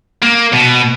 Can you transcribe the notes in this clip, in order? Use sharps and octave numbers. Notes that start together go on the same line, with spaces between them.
A#3
B2